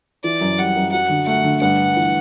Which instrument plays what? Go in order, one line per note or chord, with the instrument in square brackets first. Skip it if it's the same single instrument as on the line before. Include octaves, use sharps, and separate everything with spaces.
[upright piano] E3 [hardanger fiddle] D5
[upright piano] F#2
[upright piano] G3 [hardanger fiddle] F#5
[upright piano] F#2
[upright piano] F#3 [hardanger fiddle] F#5
[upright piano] D3
[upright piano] A3 [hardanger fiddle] F#5
[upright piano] D3
[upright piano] G2 [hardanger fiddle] F#5
[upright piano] G3
E3